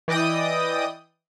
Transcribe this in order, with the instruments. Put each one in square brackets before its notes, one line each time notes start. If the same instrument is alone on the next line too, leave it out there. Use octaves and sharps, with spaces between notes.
[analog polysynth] E3 D5 D#5 G5 D#6